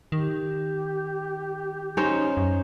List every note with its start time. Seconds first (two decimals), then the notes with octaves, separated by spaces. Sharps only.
0.12 D#3 G4
1.97 C#4 D#4 C5
2.37 F#2